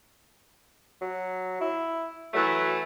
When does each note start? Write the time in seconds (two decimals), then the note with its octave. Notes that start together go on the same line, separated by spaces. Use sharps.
1.01 F#3
1.61 E4
2.34 E3 F#3 A3